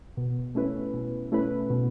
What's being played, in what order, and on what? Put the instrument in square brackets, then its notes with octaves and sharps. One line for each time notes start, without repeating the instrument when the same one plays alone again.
[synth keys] B2
A3 C#4 E4 B4
B2
A3 C#4 E4 B4
B2